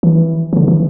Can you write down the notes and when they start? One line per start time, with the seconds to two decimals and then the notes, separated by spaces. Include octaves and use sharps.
0.03 E3
0.53 E3
0.57 D3
0.68 E3